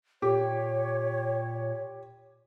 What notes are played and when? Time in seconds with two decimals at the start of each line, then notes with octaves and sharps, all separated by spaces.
0.22 A#2 G4 C#5